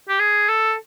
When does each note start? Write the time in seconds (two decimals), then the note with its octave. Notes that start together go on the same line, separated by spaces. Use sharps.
0.09 G4
0.19 G#4
0.48 A4